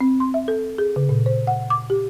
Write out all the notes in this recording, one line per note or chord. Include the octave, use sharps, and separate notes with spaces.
C4
C6
E5
A4
G#4
C#3
A#2
C5
F#5
D6
G4